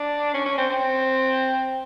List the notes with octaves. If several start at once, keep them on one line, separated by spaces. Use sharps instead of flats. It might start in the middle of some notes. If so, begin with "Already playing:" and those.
Already playing: D4
C#4
C#4
C4
C4